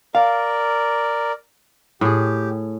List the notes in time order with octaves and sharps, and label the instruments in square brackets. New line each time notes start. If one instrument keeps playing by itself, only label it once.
[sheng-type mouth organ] A#4 D5 [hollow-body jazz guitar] F5
[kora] A2 G#4 [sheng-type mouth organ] G4